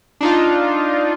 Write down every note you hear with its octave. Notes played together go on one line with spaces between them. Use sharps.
D4 D#4 F4